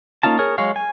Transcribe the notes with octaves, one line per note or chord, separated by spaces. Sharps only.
A#3 C#4 D#4 F4 A5
G#4 A#4 C#5
F#3 G#3 C#5 F5
G#5